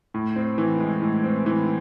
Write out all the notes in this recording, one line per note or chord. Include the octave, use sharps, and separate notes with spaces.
A2
C4
E3
G#3
A2
C4
E3